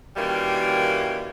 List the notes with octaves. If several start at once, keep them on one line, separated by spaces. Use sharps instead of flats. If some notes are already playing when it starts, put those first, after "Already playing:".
F#2 D#3 E3 G3 A#3